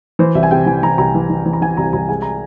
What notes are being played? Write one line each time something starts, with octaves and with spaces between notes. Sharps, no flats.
E3 C5
C2 E5
G#5
C3 G5
E3 G#5
E3 A#5
C2 A#5
E3
E3
E3
A#5
E3 G#5
C2 A#5
C2 A#5
G#3 G#5
A#5